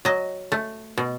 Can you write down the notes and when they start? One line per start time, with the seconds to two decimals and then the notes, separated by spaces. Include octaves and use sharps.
0.05 F#3 D#5
0.52 A3
0.98 B2